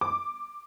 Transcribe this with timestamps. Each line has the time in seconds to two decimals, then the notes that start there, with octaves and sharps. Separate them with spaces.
0.01 D6